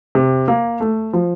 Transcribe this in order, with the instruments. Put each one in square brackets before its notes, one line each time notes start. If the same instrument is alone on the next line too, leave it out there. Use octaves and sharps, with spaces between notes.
[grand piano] C3
A#3
A3
F3